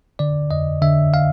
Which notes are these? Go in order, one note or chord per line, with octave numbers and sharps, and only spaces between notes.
D3 D5
F2 D#5
D3 E5
F5